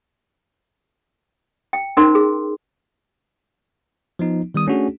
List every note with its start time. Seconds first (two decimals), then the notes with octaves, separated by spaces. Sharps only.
1.73 G5
1.97 C#4 D#4 A#4 C5 C6
2.15 G#4
4.19 F3 B3 D#4
4.54 D#3 G3 B3 D#6
4.67 A3 C#4 D4 F#4 G#4